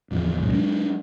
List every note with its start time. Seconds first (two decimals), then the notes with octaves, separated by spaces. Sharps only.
0.11 D1 E2 F3
0.40 C2 G2 A#2 F#3
0.52 F#3 G#3 D4